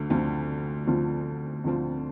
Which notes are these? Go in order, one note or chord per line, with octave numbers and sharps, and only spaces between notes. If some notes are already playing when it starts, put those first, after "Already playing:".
Already playing: D2 D3
D2 D3 F3 C4 F4
D2 D3 F3 C4 F4
D2 D3 F3 C4 F4